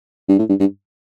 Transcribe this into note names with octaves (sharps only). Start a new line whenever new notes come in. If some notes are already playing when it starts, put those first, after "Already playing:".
G2
A2
G2
G2